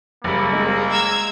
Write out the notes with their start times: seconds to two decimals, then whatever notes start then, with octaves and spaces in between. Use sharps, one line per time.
0.24 F#1 G3 A#3
0.53 G#3
0.89 A#5 E6 G#6